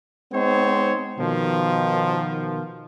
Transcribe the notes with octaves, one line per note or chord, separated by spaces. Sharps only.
G#3 B3 C4 D#4 C5 C#5
B2 D#3 F3